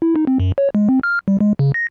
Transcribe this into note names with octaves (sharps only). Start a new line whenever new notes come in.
E4
D#4
C4
F#2
C#5
G#3
C4
F6
G3
G#3
C#3
A#6